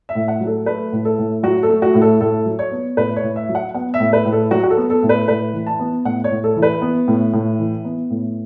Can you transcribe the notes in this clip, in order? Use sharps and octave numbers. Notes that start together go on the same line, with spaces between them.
E5
A2
F#5
F#3
A4
A3 B4
A2
A4
A2
F#3 F#4
A4
A3
F#4
A2
A4
A2 A4
F#3
C#5
B3
A2 B4
C#5
A2
E5
F#3
F#5
B3 F#5
E5
A2
B4
A2
A4
F#3 F#4
F#4
A4
B3
A4
A2
B4
A2 B4
E3
A5
B3
A2 F#5
C#5
A2
A4
E3
B4
B3
A2
A2
E3
B3
A2